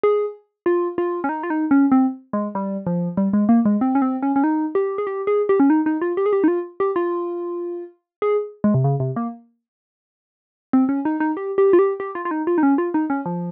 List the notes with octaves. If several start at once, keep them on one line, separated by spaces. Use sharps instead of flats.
G#4
F4
F4
C#4
D#4
F4
D#4
C#4
C4
G#3
G3
F3
G3
G#3
A#3
G#3
C4
C#4
C4
C#4
C#4
D#4
G4
G#4
G4
G#4
G4
C#4
D#4
D#4
F4
G4
G#4
G4
D#4
F4
G4
F4
G#4
G#3
C3
C#3
C3
A#3
C4
C#4
D#4
D#4
G4
G4
F4
G4
G4
F4
F4
D#4
F4
D#4
C#4
F4
D#4
C#4
F3